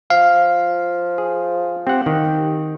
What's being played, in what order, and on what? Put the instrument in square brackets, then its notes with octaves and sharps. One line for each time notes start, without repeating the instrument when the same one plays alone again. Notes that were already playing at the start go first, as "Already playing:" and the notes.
[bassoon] F3 [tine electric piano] F5
[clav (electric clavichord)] G#4
[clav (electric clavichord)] C4 F#5 [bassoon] G4
[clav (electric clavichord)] D#3